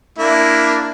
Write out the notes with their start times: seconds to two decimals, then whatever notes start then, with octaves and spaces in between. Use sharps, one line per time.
0.19 A#3 D4 E4